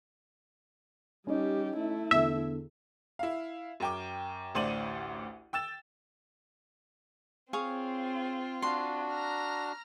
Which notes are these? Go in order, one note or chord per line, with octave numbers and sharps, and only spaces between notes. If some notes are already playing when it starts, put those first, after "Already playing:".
G3 C#4 D#4 G4
A3 E4
E2 D3 E5
E4 F5
F#2 G5 D6
A1 D2 C5 D5 D#7 F#7
G5 E6 A6 E7
C4 F4 G#4 C#5 F5
D4 F#4 F5 C6
A#5 F6